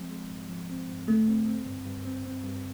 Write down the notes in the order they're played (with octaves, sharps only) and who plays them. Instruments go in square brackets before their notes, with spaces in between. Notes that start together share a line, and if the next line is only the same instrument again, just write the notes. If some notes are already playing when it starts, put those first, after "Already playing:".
Already playing: [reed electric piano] F3 G#3 C4
G#3
G#2
F3
C4
G#2
[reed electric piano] D3 [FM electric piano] A3
[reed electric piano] C4
C4
G2
G2
C4
C4
G2